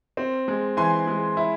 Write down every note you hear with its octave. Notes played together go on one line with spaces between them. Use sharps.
C4
G#3
E3 G#5 C6
G#3
E4